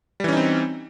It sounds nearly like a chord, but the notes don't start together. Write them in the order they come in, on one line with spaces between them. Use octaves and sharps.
G3 E3 C#4 D#4 C4